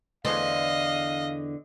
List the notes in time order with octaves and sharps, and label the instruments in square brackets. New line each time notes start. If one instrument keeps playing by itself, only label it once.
[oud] E2 D3 C5 [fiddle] D#5 [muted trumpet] F5